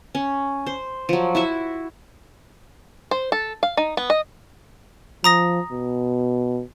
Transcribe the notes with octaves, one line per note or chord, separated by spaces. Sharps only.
C#4
C5
F3 F#3
E4 F#4 E5
C5
A4
F5
D#4
B3
D#5
F3 A#5 D#6 A#6
B2